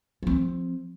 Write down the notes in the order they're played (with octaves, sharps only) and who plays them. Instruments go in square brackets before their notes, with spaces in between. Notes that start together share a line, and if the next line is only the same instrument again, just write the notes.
[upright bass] F3 C4